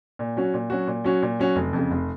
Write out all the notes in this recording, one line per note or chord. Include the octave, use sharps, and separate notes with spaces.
A#2
F#3 C#4 F#4
A#2
F#3 C#4 F#4
A#2
F#3 C#4 F#4
A#2
F#3 C#4 F#4
F1
F2 C#3
F1